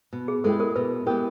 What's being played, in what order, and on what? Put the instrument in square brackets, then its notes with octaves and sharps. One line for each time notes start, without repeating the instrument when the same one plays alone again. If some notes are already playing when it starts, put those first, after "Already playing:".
[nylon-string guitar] B2
[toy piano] G#4
[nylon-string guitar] G#3 B3 E4 G4 [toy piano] A4
[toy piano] A#4
[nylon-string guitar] B2 [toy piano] B4
[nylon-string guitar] G#3 B3 E4 G4 [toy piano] A#4